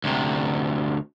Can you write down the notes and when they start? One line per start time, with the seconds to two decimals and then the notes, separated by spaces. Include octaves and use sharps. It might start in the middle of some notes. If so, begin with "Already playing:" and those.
0.04 D2 C3